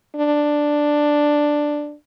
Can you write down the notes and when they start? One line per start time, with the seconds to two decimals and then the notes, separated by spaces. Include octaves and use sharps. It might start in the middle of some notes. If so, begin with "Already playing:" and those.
0.16 D4